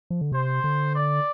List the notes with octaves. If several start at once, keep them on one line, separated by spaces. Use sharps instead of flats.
F3
D3
C3 C5
D3
D5